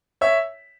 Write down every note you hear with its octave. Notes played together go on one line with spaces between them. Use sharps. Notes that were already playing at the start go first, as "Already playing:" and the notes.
C#5 E5